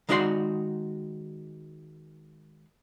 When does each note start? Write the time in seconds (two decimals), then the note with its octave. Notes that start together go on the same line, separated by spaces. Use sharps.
0.09 D#3 G#3 D#4 F#4 D5 C6